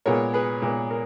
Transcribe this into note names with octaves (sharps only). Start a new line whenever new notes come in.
A#2 G#3 B3 A#4 C#5
G#4 B4
A#2 G#3 B3
A#4